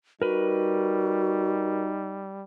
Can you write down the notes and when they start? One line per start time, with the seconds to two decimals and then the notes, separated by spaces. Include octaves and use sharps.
0.22 G3 D#4 F#4 A#4 B4